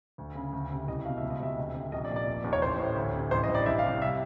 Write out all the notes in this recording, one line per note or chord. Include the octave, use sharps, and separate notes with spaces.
D2
C#3
D2
C3
C2 D#5
B2 F5
E5
C#2
D#5
C3 E5
D2
C3
A#1 D#5
D5
A#2
D5
F1
D#2
C#5
A1 C5
A2
D2
C3
A1 C5
D#5
G2
D5
C2 E5
F5
C3
E5